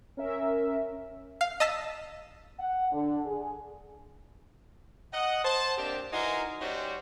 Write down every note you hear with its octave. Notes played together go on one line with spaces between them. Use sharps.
C#4 A#4 E5
F5
D#5 A5 E6 B6
F#5
D3
G#4
D#5 F#5
C5 A5
A#3 C4 D4 G4
E3 D#4 F#4 A#4 G#5 C6
G3 C#4 D#4 F#4 G4 C5